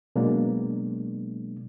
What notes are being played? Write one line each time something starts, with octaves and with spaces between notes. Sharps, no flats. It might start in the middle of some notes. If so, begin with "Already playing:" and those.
B2 F#3 G#3 A#3 D4